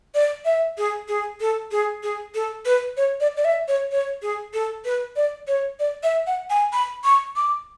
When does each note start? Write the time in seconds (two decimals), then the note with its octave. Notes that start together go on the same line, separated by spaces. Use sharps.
0.15 D5
0.45 E5
0.78 G#4
1.08 G#4
1.41 A4
1.71 G#4
2.03 G#4
2.35 A4
2.66 B4
2.97 C#5
3.21 D5
3.37 D5
3.45 E5
3.68 C#5
3.92 C#5
4.22 G#4
4.54 A4
4.85 B4
5.16 D5
5.48 C#5
5.80 D5
6.03 E5
6.27 F#5
6.50 G#5
6.73 B5
7.04 C#6
7.36 D6